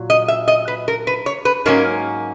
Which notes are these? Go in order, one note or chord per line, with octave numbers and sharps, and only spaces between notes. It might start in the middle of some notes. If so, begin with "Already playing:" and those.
Already playing: A#2 F#3
D#5
E5
D#5
B4
A#4
B4
C#5
B4
G#2 F#3 A#3 C#4 A#4